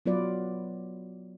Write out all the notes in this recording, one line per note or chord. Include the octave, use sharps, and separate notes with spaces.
F#3 B3 F4 B4 D5